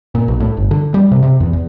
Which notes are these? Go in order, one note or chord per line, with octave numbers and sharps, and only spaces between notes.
A#2
B1
A2
G1
D3
G3
C3
C3
E2
E2